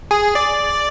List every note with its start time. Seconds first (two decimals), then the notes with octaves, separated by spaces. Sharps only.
0.11 G#4
0.35 D5